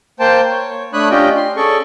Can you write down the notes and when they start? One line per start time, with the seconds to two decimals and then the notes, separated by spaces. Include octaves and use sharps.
0.20 A#3 C5 G5 A5
0.50 C#5
0.93 A3 D4 C#5 B5 D#6 F#6
1.11 C#4 D4 F4 G4 D#5 G5
1.36 C6
1.57 C#4 G#4 A4 D5 C#6